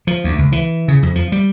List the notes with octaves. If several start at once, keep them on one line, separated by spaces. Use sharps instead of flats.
F3
D2
C#2
E3
C#3
F2
F3
G3